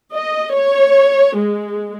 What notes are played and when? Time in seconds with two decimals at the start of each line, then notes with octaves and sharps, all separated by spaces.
0.14 D#5
0.55 C#5
1.38 G#3